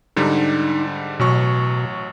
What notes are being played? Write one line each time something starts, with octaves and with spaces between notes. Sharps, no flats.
G#2 D3 G3 D#4
A1 B2 F#3 C#6